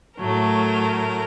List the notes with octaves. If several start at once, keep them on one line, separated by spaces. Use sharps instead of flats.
A2 F#3 A3 A#4